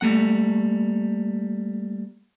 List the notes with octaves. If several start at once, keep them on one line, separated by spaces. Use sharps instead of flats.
G3 A3 A#3 F#5